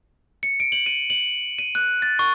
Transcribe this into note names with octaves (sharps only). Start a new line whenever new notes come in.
C#7
D7
F#7
D#7
F#7
D#7
F#6
A6
C#6